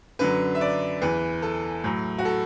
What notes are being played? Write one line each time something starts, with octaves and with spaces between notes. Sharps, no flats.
F#2 D3 F#3 B4
E5
D5
E2 E3 B4
A4
A2 F#3
F#4
A4